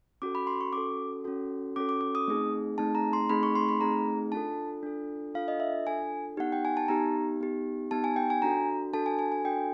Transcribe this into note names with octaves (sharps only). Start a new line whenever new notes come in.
C#4 F#4 A4 D6
B5
C6
C#6
C#4 F#4 A4 D6
C#4 F#4 A4
C#4 F#4 A4 D6
D6
D6
D#6
A3 C4 D#4 G#4
A3 C4 D#4 G#4 A5
A#5
C6
A3 C4 D#4 G#4 B5
C#6
C6
B5
A3 C4 D#4 G#4 A#5
D4 F4 A4 A5
D4 F4 A4
D4 F4 A4 F5
D#5
E5
D4 F4 A4 G#5
B3 D#4 G4 F#5
G5
G#5
A5
B3 D#4 G4 A#5
B3 D#4 G4
B3 D#4 G4 A5
G#5
G5
G#5
D4 F#4 A4 A#5
D4 F#4 A4 A5
G#5
G#5
G#5
D4 F#4 A4 G5